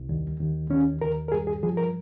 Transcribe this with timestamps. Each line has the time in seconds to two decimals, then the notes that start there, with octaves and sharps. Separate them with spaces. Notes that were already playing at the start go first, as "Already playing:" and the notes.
Already playing: C2
0.09 D#2
0.40 D#2
0.70 D#2 C#4
1.02 D#2 A#4
1.28 A#4
1.32 G2 G#4
1.47 G#4
1.63 F3 G#4
1.77 A#4